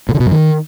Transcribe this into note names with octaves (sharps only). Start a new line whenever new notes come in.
A#2
D3
B2
F#2
D#3